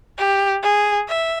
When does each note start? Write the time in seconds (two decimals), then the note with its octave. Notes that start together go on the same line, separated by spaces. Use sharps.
0.18 G4
0.63 G#4
1.08 E5